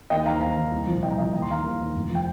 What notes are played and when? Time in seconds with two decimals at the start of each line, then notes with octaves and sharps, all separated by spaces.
0.10 D#2 D#5 G5
0.26 D#3 F5 A#5
0.41 D#2 F5 A#5
0.57 D#3
0.71 C2
0.87 A#2 F3
1.03 C2 D#5 G5
1.10 A#5
1.18 F3 D#5 G5
1.21 A#2
1.33 D#2 A#5
1.42 C6
1.49 D#3 F5 A#5
1.64 D#2
1.80 D#3
1.95 F1
2.10 F3 G5